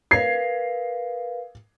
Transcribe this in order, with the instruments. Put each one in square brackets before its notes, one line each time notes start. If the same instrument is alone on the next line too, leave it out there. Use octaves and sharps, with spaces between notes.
[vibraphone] A#4 B4 F5 [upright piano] G#6 C7